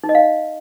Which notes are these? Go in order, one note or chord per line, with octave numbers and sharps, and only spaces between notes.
D#4
D#5
F5